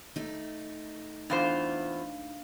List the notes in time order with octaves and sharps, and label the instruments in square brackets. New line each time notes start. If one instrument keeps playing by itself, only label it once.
[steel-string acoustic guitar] A3 D#4
[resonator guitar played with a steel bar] E2 F4 C5 [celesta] D4 F5